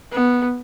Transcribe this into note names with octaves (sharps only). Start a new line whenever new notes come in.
B3